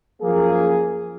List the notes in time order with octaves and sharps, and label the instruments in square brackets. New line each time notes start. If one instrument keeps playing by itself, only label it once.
[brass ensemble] F#2 F3 A#3 G#4